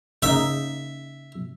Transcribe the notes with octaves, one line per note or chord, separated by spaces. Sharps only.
C#3 A#3 D#4 E5